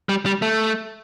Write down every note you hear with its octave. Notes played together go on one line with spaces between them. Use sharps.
G3
G3
A3